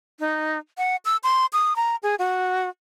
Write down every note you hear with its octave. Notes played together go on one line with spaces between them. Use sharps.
D#4
F#5
E6
C6
D#6
A#5
G#4
F#4